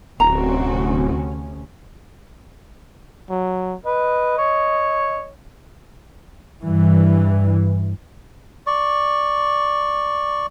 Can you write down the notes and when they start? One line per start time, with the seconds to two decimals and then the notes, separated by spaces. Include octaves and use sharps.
0.20 D1 D2 C3 C4 C#4 F#4 A#5
3.30 F#3
3.86 B4 D#5
4.38 C#5
6.62 G2 E3
8.67 D5 C#6